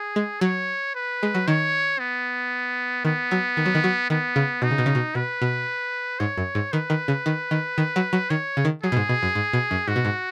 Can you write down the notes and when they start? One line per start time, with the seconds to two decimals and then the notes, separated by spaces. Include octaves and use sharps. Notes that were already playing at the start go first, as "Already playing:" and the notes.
Already playing: G#4
0.16 G#3
0.41 F#3 C#5
0.95 B4
1.23 G#3
1.35 F#3
1.48 D#3 C#5
1.99 B3
3.05 D#3 B3
3.31 F#3
3.57 D#3
3.66 F#3
3.75 D#3
3.84 F#3
4.10 D#3 B3
4.36 C#3
4.62 B2 D#4
4.71 C#3
4.78 B2
4.86 C#3
4.95 B2
5.15 B2 B4
5.42 B2
6.19 G#2 C#5
6.38 F#2
6.55 G#2
6.73 D#3 B4
6.90 D#3
7.08 C#3
7.26 D#3
7.51 D#3
7.78 D#3
7.96 F#3
8.13 F#3
8.30 D#3 C#5
8.57 C#3
8.65 D#3
8.83 F#3 G#4
8.92 B2
8.97 G#2
9.09 B2
9.23 F#2
9.35 G#2
9.53 B2
9.71 F#2
9.88 G#2 F#4
9.96 B2
10.05 G#2